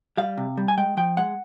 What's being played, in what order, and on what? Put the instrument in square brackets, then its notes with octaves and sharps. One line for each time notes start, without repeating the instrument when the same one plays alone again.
[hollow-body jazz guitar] G3 F5
C3
G3
G#5
G#3 G5
F3 G5
G#3 F#5